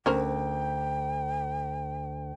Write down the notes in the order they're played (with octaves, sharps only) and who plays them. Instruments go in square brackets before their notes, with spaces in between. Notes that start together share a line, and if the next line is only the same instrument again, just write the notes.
[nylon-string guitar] D2 [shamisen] C#4 A#4 C5 [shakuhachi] G5